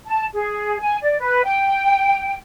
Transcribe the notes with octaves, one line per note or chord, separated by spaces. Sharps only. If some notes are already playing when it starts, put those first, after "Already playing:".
A5
G#4
G#5
D5
B4
G5